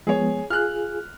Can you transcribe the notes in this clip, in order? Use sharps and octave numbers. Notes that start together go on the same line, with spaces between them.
F3 G#3 B3 G#4 C#5
F4 G#4 F6 F#6